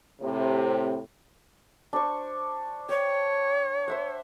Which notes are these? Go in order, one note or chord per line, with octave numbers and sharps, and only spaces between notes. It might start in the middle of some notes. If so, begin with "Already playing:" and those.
A2 C3
D4 C5 C#6
C#5 G5
C5 E5 F#5